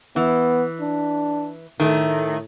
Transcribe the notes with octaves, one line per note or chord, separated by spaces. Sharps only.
E3 B3
D4
A2 D#3 A3